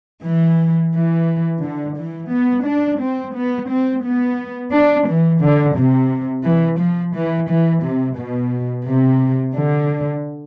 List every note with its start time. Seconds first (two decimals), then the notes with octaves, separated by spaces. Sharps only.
0.25 E3
0.94 E3
1.64 D3
1.98 E3
2.32 B3
2.66 D4
3.02 C4
3.36 B3
3.71 C4
4.05 B3
4.73 D4
5.08 E3
5.42 D3
5.77 C3
6.46 E3
6.80 F3
7.16 E3
7.50 E3
7.84 C3
8.19 B2
8.88 C3
9.57 D3